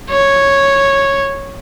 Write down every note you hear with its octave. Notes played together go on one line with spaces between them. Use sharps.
C#5